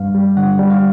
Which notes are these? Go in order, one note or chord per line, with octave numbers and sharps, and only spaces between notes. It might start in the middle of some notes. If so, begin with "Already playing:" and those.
Already playing: G2 G3 F5
G3
D3 F#5
G3
F5